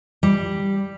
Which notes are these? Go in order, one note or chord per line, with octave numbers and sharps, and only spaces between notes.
G3